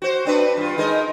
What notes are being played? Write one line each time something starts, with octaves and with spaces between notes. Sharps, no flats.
F#4 C5
C4 D4 B4
G2 F4
G#3 D#4 A#4